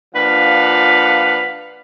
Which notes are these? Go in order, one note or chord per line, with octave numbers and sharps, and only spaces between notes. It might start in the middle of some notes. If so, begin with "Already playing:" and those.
A#2 F3 D4 B4 F5 F#5